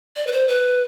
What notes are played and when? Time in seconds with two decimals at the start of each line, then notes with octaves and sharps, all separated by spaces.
0.16 D5
0.27 B4
0.32 C5
0.48 B4